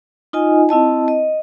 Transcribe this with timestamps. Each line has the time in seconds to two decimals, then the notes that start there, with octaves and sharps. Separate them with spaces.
0.33 D#4 F4 D#5 G#5
0.69 C4 E4 D#5 A5
1.08 D#5